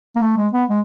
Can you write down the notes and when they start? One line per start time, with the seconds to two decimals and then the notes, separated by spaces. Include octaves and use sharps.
0.15 A#3
0.21 A3
0.37 G#3
0.53 B3
0.69 G#3